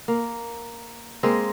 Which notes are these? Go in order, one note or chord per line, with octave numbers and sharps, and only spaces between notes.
A#3
G#3 A#3 C4